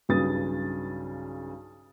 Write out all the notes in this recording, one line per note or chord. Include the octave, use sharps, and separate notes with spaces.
B1 G2 C#3 B4 D#6 A6